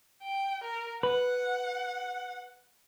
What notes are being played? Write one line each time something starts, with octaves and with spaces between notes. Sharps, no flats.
G5
A#4
B4 F#5